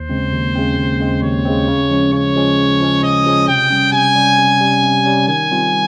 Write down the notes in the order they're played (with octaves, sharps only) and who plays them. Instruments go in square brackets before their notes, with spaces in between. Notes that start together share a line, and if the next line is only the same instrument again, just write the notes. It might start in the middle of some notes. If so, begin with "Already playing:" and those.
Already playing: [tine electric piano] D#2 [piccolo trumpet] C5
[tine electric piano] C#3 G#3 C4
D#2
C#3 G#3 C4
D#2
C#3 G#3 C4
[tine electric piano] D#2 [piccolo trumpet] C#5
[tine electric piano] C#3 G#3 C4
C#3
F3 G#3 C#4
[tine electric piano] C#3 [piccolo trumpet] C#5
[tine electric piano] F3 G#3 C#4
C#3
F3 G#3 C#4
[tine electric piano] C#3 [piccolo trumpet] D#5
[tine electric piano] F3 G#3 C#4
[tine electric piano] C3 [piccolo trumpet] G5
[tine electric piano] G3 C#4
[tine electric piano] C3 [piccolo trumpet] G#5
[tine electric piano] G3 C#4
C3
G3 C#4
C3
G3 C#4
[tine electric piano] D#3 [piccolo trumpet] G#5
[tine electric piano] G3 C4 F4